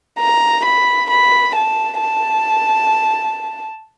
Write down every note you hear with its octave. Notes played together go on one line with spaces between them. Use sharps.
A#5
B5
B5
A5
A5